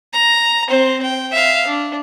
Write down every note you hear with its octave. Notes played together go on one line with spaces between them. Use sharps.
A#5
C4 C5
G5
E5 F5
D4